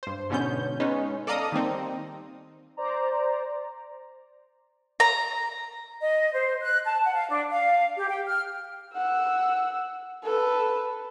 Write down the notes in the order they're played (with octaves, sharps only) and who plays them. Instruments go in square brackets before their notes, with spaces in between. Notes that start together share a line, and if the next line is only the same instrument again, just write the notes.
[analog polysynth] G2 C5
G#2 B2 D3 B3 C#4 G6
G#3 B3 C#4 D#4
A4 D5 D#5 F5 A#5 D#6
D#3 G3 A#3 C4 D#4
C5 D5 A#5
[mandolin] A#5
[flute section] D#5
C5
F#6
A5
F#5
F5
D4
F5
G4
G5
F6
[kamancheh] F#5 E6
A4 B4